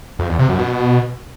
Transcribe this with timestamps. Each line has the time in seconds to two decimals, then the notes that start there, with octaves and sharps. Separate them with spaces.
0.19 F2
0.29 E2
0.39 C3
0.49 F#2
0.59 B2